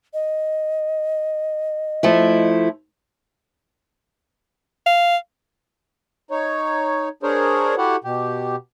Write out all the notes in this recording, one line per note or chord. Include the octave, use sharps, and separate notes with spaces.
D#5
F3 A3 E4
F5
D#4 C#5
D4 G#4 A#4 C5 C#5
E4 F#4 G4 A4 F#5
B2 G4